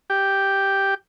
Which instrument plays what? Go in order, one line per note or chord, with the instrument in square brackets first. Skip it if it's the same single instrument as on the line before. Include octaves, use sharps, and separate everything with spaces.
[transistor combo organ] G4